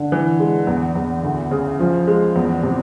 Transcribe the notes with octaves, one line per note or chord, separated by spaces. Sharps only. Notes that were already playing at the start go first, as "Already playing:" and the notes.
Already playing: D3
E3
G#3
E2
E2
D2
C#3
F3
G#3
E2
C3